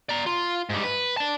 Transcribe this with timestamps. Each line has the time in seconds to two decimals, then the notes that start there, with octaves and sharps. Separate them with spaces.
0.09 D5 A#5
0.26 F4
0.70 G#2 G3
0.84 B4
1.17 D5 A5